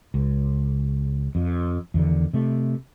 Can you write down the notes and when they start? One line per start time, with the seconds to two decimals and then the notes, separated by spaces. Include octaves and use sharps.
0.14 C#2
1.35 F2
1.94 E2 D3 D#3
2.33 C3 A3